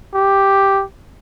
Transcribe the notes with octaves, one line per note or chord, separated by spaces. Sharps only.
G4